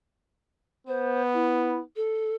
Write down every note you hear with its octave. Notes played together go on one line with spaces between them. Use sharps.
B3 C5
E4
A4